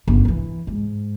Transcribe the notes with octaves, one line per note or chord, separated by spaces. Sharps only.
G1 C#3
D3 E3
G#2